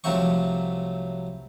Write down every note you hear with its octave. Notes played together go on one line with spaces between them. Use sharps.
C2 F3 F#3 A3 C4 C#6